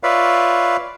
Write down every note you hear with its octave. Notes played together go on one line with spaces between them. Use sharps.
F4 B4 C#5 D5 E5 F5